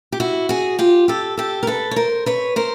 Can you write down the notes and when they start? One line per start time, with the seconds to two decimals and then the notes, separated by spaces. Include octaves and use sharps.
0.12 G4
0.20 E4 F#4
0.49 F#4 G#4
0.79 F4 G4
1.08 G4 A4
1.37 G4 A4
1.63 A#4
1.67 A4 B4
1.91 C#5
1.96 A#4 C5
2.26 B4 C#5
2.56 A#4 C5